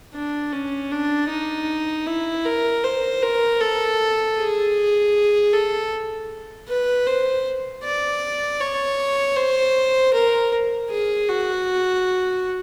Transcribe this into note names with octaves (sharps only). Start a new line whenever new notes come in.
D4
C#4
D4
D#4
E4
A#4
C5
A#4
A4
G#4
A4
B4
C5
D5
C#5
C5
A#4
G#4
F#4